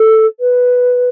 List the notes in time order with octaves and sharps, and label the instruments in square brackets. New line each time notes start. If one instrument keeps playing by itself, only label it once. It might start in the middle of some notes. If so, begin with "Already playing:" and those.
Already playing: [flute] A4
B4